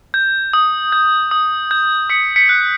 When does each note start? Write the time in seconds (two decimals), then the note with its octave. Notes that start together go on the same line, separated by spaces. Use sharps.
0.14 G6
0.53 D#6
0.92 G6
1.31 D#6
1.71 G6
2.10 D#6 B6 C#7
2.36 B6 C#7
2.49 F#6